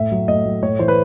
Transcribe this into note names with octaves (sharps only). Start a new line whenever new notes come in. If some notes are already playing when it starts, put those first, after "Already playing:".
Already playing: A2 E5
F#3
A2 D#5
F#3
A2 C#5
E3 C5
B4